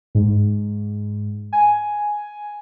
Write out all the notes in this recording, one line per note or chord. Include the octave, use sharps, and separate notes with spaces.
G#2
G#5